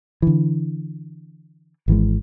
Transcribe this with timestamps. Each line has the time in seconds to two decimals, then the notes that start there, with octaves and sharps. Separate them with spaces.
0.22 D3 E3
1.88 G#1 E3 G#3